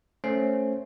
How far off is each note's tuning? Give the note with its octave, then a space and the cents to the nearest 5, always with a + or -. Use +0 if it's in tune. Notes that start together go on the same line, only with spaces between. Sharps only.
A3 +0 C#4 +0 C5 +0